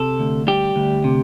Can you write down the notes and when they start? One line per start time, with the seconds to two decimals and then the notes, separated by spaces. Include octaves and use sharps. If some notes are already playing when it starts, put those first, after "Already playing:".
Already playing: C3 A4
0.19 D2
0.47 G3 G4
0.76 D2
1.04 C3